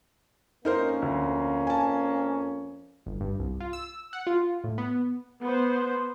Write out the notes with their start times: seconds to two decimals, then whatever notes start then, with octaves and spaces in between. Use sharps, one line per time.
0.65 F2 A#3 C#4 D#4 A#4 C5
1.02 D2
1.67 G#5 A5
3.06 G1
3.21 G2
3.39 C2
3.60 F4
3.73 E6
4.13 F#5
4.27 F4
4.64 A2
4.78 B3
5.42 B3 C5